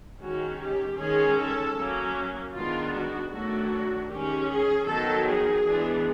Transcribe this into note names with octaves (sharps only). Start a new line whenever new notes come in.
D#3 G#3 C#4 F#4
G4
D#3 G#3 C#4 G#4
A4
F#3 A#3 C#4
D#3 G#3 B3 D4 F4
F#4
D#3 F#3 A3 D4 F#4
D#3 G#3 C#4 G4
G#4
D#3 F#3 B3 A4
G#4
E3 G#3 B3 D4